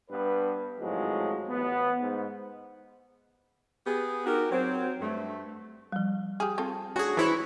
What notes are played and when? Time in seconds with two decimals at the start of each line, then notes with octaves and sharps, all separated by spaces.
0.11 G2 B3 B4
0.80 G#1 A2 F3 F#3 G#3
1.48 A1 B3
2.01 G#2
3.85 B3 G4 G#4
4.26 D#4 F#4 G4 A#4
4.50 F#3 C4
5.01 G2 A3
5.92 F3 G3
6.40 G4 G#4 D#6 F6
6.58 C4 F4 A4
6.96 A3 C#4 D4 F#4 G#4
7.17 E3 G#3 E4 C5 C#5